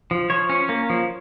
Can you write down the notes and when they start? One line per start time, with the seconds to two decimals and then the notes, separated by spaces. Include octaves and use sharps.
0.11 F3
0.30 F3 C#5
0.49 C#4
0.69 A#3
0.90 F3